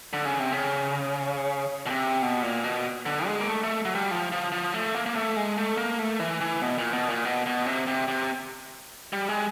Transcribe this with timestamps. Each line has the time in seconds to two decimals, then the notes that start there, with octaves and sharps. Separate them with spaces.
0.13 D3
0.25 C#3
0.39 C3
0.52 C#3
1.86 B2
1.90 C3
2.22 B2
2.43 A#2
2.64 B2
3.06 D3
3.26 G#3
3.40 A#3
3.48 A3
3.63 A3
3.85 F#3
3.95 G3
4.11 F3
4.32 F3
4.52 F3
4.74 A3
4.95 A#3
5.06 A#3
5.16 A3
5.36 G#3
5.58 A3
5.77 A#3
5.99 A3
6.20 E3
6.41 E3
6.62 B2
6.78 A#2
6.93 B2
7.09 A#2
7.25 B2
7.46 B2
7.66 C3
7.87 C3
8.08 C3
9.13 G3
9.29 G#3